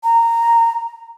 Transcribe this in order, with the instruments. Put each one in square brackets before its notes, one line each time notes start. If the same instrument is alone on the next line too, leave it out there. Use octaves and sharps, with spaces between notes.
[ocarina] A#5